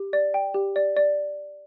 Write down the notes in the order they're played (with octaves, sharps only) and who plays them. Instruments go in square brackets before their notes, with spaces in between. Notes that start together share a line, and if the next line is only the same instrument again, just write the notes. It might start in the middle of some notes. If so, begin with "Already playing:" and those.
Already playing: [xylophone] G4
D5
G5
G4
D5
D5